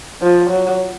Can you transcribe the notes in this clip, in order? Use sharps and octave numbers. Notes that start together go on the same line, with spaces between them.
F3
F#3